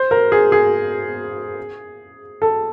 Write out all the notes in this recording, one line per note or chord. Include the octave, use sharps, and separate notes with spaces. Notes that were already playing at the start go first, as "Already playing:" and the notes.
Already playing: C5
A#4
G#4
G#4
A4